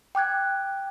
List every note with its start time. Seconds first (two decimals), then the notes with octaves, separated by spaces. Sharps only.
0.15 G5 D6 F#6 G#6